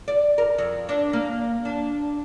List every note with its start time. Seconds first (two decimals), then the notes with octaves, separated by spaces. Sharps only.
0.08 D5
0.38 A#4
0.58 F2
0.89 D4
1.13 A#3
1.65 D4